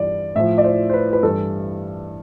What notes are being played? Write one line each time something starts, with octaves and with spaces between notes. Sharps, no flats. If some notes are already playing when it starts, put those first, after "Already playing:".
Already playing: G2 E3 D5
A2 F3 E5
D5
C5
C5
B4
B4
G2 E3 A4